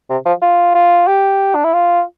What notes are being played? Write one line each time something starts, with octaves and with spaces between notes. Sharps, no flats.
C3
F3
F4
F4
G4
D4
E4
F4